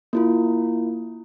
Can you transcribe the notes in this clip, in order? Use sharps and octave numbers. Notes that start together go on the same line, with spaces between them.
A#3 E4 F4